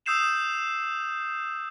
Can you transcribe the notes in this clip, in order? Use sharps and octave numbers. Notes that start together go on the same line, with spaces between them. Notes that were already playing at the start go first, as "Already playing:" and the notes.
D#6 E6 G6 C7 E7 F7